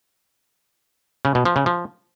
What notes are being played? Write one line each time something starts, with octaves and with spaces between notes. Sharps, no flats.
C#3
B2
F3
C#3
F3